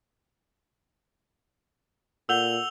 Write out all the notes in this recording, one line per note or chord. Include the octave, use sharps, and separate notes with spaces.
A#2 A4 F#5 E6 G6 F7 G7